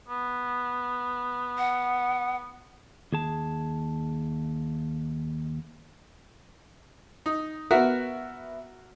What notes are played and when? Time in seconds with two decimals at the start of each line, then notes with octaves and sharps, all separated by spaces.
0.08 B3
1.58 F#5
3.13 D#2 G#4 A5
7.26 D#4
7.71 B3 F#4 A#4 E5 F#5